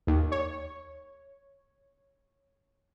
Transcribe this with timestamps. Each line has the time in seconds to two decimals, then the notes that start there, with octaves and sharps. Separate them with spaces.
0.07 D#2
0.32 C#5